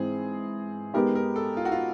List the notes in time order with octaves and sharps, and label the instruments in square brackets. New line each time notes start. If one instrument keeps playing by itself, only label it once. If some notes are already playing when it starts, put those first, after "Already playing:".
Already playing: [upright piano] G#2 E3 G#3 C4 [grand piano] G#4
[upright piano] G#3 B3 D#4 G4 [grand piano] A#4
[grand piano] A#4
A4
F4
F#4
F4